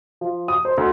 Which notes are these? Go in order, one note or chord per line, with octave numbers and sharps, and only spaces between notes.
F3
D#6
C5
D2